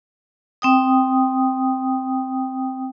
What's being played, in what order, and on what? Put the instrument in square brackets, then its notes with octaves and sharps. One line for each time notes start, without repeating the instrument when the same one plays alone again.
[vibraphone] C4 G5 D#6